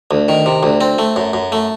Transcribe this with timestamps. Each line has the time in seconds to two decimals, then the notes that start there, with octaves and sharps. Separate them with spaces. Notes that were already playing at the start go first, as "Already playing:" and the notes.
0.11 D2
0.28 D#3
0.46 C3
0.63 D2
0.81 C4
0.98 A3
1.16 F#2
1.33 F#2
1.52 A3